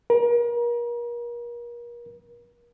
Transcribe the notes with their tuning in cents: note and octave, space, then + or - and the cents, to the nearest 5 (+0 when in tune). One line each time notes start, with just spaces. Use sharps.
A#4 +35